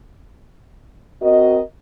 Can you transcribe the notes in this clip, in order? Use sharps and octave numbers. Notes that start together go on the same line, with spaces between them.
C4 F#4 A#4 D#5